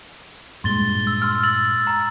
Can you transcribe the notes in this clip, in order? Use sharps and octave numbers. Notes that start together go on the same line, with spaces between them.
G2 A#2 G#3 C6 A6 G7
E6
C6 E6 F6
E6 A6 F#7
A#5